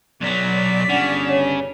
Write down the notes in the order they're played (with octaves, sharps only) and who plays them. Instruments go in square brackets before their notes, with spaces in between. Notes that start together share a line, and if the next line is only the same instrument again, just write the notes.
[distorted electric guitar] B1 F#3 [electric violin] D5 B6
[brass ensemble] G1 D4 [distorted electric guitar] C#3 [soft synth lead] F#5
[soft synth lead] C#5